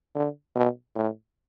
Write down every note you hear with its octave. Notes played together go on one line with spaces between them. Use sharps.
D3
B2
A2